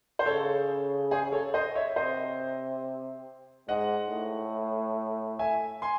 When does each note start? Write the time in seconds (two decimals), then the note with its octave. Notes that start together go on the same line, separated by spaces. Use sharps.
0.19 C5
0.25 C#3 A4 C#5
1.11 G#4 C5
1.32 A4 C#5
1.54 C5 D#5
1.75 C#5 E5
1.96 C3 C5 D#5
3.68 G#2 D#5 F#5
4.10 A2
5.39 E5 G#5
5.82 G#5 C6